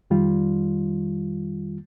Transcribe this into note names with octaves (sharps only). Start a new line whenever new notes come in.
F2 D#3 G3 F4